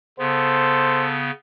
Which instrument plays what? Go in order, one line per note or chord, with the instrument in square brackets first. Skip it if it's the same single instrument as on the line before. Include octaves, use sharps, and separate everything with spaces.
[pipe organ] C#3 B3 [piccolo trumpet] A4 [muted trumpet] C5